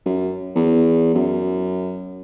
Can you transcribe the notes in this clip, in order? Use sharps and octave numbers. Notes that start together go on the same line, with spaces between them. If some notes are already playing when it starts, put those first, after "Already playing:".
F#2
E2
F#2